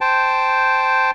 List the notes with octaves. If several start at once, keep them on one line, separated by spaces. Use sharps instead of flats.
C5 G5 A5